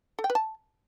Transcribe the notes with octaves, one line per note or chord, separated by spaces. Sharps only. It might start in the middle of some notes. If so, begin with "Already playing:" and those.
A4
G5
B4
A5